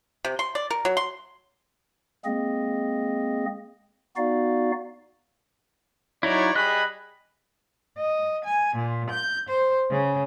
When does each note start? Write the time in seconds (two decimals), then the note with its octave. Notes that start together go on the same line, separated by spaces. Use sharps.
0.25 C3
0.39 C6
0.55 D5
0.70 A#4
0.85 F#3
0.97 C6
2.25 G#3 A#3 C4 G#4 D#5
4.17 B3 D#4 F#4 D5 F5
6.23 F#3 D#4 E4 C#5 D5
6.55 G3 G#4 D#5 B5 F#6
7.98 D#5
8.45 G#5
8.77 A#2
9.11 G6
9.50 C5
9.90 C#3